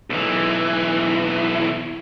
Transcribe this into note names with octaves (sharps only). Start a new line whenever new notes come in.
B1 E3